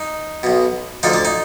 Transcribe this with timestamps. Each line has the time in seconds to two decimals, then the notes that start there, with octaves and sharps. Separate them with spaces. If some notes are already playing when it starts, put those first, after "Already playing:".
Already playing: D#4
0.43 B1 B2
1.03 D2 D3 F3 D#4
1.13 D4
1.25 D#4